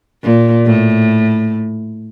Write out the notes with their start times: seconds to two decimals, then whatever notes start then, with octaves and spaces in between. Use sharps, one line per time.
0.24 A#2
0.66 A2